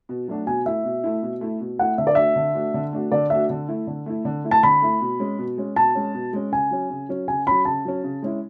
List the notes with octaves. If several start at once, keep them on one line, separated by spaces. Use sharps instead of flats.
B2
F#3 A3 D4 F#4
B2 G#5
A3 E4 E5
B2
A3 E4
B2
A3 E4
B2
A3 E4 F#5
D3 E5
D5
A3 D4 F#4 E5
D3
A3 D4 F#4
D3
A3 D4 F#4
D3 D5
A3 D4 F#4 E5
D3
A3 E4
D3
A3 E4
D3
A3 E4
A5
D3 B5
A3 E4
B2
G#3 C#4
B2
G#3 C#4
B2 A5
G#3 C#4
B2
G#3 C#4
C#3 G#5
F#3 C#4
C#3
F#3 C#4
C#3 G#5
F#3 C#4 B5
C#3 A5
F#3 C#4
C#3
G#3 C#4 E4